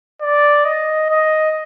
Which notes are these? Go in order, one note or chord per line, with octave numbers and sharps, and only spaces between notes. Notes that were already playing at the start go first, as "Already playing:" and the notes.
D5
D#5
D#5